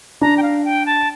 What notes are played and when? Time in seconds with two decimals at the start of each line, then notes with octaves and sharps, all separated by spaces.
0.21 D4 A#5
0.37 G5
0.42 F5
0.65 G5
0.86 A5